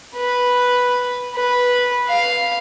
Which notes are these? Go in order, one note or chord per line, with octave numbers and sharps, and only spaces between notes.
B4
B4
F5